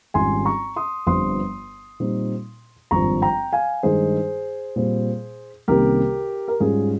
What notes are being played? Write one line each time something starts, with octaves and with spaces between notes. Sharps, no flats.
G#1 G#2 G3 C#4 F4 G#5 C6
A#5 C#6
C6 D#6
G1 G2 F3 C4 F4 C6 D#6
A#2 G3 C4 D#4
G#1 G2 F3 C4 F4 A#5 C#6
G5 A#5
F5 G#5
G2 D#3 G#3 D#4 G#4 C5
A#2 G3 C4
C2 C3 D#3 A#3 C#4 G4 A#4
A#4
G#2 G3 C#4 F4 G#4